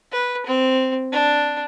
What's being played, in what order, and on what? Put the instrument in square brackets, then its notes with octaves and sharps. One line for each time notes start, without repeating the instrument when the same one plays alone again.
[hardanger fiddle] B4
C4
D4